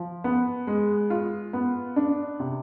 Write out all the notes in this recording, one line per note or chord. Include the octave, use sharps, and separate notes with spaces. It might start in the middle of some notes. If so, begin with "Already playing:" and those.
Already playing: F3
B3
G#3
F4
B3
D4
C3